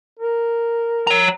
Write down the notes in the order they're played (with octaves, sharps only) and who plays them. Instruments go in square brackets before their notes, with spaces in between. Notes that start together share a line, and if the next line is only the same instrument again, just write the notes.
[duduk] A#4
[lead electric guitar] C#5 A#5